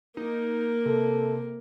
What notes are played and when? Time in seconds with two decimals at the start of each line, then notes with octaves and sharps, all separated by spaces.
0.17 A#3 D#4
0.85 C3 A4